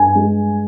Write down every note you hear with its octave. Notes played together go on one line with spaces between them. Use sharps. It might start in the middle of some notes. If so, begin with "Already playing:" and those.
Already playing: G2 G#5
G#3